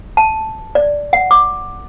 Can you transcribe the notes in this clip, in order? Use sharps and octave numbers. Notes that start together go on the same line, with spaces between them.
A5
D5
F#5
D6